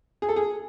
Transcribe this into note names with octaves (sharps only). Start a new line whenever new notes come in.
G#4
A4
G#4